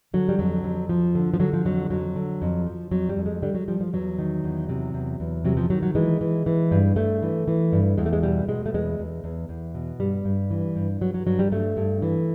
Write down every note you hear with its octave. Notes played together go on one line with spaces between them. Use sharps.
D3 F#3
G3
F2 F#3
F2
F3
D3
F3
D3 F#3
F3
F2 F#3
F2 F#3
D3
F2
F3
F2 F#3
G3
F2
G#3
D3 G3
F#3
F3 G3
F3
E2 F#3
D#3
E2
C3
E2
E2
C3 F#3
F3
D#3 F#3
F#3
E3 G#3
E3
E3
G2
G2 A3
E3
E3
G2
E2 G#3
A3
G#3
B2 G3
B2 G#3
A3
E2 G#3
E2
E2
E2
B2
G2 G3
G2
E3
G2
G2 F#3
F#3
G2 F#3
G3
G2 A3
G2
E3